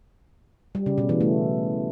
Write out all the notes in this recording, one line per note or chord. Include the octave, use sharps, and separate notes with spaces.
G3
C#3
B2
E3
A3